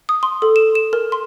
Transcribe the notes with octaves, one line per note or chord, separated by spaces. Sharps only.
D#6
C6
A4
E7
E7
A#4
C6